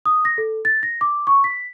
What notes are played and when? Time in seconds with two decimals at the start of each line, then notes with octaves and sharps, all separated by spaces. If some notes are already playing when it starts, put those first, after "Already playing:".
0.06 D#6
0.25 A#6
0.38 A4
0.65 A6
0.83 A#6
1.01 D6
1.27 C#6
1.44 B6